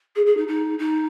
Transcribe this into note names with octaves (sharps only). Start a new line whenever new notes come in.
G#4
G#4
D#4
D#4
D#4